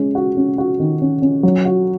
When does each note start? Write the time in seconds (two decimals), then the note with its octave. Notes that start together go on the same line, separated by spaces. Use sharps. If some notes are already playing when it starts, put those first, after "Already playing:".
Already playing: G#3 C#4
0.15 F#4
0.37 C#4
0.58 F#4
0.80 D#3
1.01 C#4
1.22 C#4
1.43 F#3
1.65 F#4